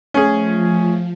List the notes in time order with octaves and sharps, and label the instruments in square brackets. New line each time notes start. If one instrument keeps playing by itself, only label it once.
[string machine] F3 [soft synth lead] A3 [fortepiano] C#4 G#4